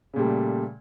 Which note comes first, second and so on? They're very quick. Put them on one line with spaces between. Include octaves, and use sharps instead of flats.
C#3 A#2 G3 A3